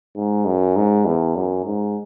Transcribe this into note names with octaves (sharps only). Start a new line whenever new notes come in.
G#2
F#2
G#2
E2
F#2
G#2